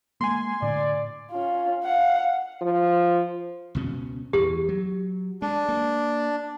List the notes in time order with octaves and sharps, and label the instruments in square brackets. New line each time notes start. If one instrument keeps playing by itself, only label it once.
[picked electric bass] G#3 A#3 [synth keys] G#5 C6
[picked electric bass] A2 D3 [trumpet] D5
[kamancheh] C#4 F4
F5 F#5
[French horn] F3
[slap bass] C#2 B2 C#4
[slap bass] E2 E3 [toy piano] G4
[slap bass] F#3
[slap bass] G#3 [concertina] D4
[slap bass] A#3